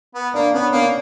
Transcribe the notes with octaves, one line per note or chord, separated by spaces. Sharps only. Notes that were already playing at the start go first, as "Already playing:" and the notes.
B3
A#3 D4
B3 C#4
A#3 C#4